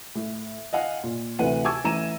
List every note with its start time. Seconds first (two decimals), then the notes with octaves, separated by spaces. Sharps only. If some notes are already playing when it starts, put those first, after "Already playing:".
0.15 A2
0.73 D#5 F5 F#5 G#5
1.03 A#2
1.39 D2 C3 E3 B4 F#5 D#7
1.64 G#5 A5 C#6 D6 E6 G#6
1.84 A1 E3 A#5 D#7 E7